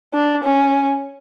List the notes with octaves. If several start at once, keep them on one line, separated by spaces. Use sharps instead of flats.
D4
C#4